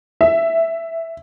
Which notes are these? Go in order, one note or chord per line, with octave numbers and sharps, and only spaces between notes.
E5